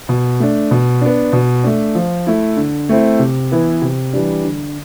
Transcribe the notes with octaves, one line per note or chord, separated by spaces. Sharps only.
B2
A3 D4
B2
B3 D4
B2
A3 D4
F3
A3 E4
D3
A3 C4 E4
C3
E3 B3 E4
C3
E3 G3 D4
D3